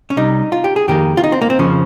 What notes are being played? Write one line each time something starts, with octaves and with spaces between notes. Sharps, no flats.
C#4
C2 C3 G3 D#4
F4
G4
G#4
F2 D#3 A#3 G4
F4
D#4
C4
A#3
C4
F2 C#3 F3 C#4